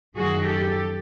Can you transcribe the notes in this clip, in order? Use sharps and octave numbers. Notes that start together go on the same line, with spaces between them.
F#2 D#3 F#3 F#4 G#4
G4 A4